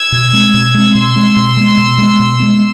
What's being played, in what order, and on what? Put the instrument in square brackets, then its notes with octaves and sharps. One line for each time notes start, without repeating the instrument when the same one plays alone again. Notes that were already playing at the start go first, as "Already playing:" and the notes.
Already playing: [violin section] E6 G#6
[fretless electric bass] B2
G#3 C4
B2
G#3 C4
[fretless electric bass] B2 [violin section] C6 E6
[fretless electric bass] G#3 C4
B2
G#3 B3
B2
G#3 B3
B2
G#3 B3